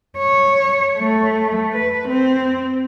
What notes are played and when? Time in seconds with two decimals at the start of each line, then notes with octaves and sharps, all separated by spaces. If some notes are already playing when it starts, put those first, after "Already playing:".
0.18 C#5
0.99 A3
1.73 B4
2.08 C4